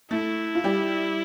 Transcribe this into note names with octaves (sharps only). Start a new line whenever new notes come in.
A3 E4 A4
F4
G3 G4